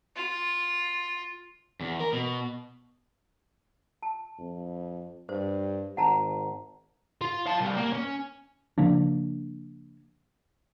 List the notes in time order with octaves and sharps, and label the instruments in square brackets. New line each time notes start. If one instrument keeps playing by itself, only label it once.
[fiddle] F4
[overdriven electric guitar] E2
A#4
B2
[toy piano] A5
[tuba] F2
[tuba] G2 [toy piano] C5
[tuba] G#1 [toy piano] F#5 A5 A#5
[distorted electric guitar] F4
F5 A5
C2
A#3
C#4
[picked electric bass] C#3 F3 A#3 D4